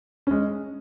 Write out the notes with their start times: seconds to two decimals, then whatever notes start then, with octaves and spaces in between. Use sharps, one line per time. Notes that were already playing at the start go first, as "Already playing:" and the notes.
0.27 G#3 C#4